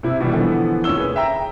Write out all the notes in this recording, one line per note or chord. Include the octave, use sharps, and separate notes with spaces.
C3 E4
B2 E3 G3
D3 E3 F3 B3
F1 C#4 F4 E6 G7
G#4 B4
E5 G5 A#5